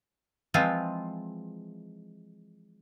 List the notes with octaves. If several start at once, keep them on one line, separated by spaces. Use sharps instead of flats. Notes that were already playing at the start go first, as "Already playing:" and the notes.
E3 F3 G#3 C4 F4